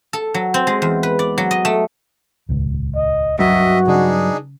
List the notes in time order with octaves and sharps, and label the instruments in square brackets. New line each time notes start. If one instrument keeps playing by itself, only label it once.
[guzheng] A4
F#3
C4
G#3
E2
B4
D5
F#3
D#5
A3
[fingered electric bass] D#1 C#2 G#2
[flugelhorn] D#5
[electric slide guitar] G2 F#3 [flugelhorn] F#4 [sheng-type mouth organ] D#5 E5
[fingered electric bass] C#3 [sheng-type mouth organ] D4 D#4 G#4